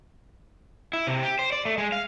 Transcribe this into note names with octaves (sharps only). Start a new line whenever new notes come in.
E4
C3
G4
C5
D5
A3
G#3
F5